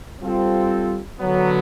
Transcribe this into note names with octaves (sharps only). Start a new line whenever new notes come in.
G3 C4 F4 A4
D3 F#3 B3